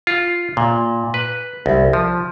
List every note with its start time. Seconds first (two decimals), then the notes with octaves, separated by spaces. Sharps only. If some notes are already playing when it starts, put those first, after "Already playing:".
0.07 F4
0.57 A#2
1.14 B4
1.66 C2
1.93 F3